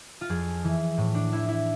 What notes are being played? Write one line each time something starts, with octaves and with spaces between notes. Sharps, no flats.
F4
F2 G#4
E3
A2
D4
E3 E4
E4